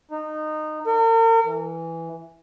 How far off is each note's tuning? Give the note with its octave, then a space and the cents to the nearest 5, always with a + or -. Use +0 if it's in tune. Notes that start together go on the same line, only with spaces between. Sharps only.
D#4 -20
A#4 -40
E3 +0